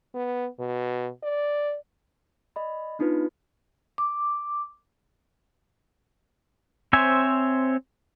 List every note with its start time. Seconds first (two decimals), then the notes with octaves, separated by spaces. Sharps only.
0.14 B3
0.59 B2
1.23 D5
2.56 D5 D#5 B5
2.99 B3 D4 D#4 F4 B4
3.98 D6
6.93 C4 C5 C#5 E5 G#5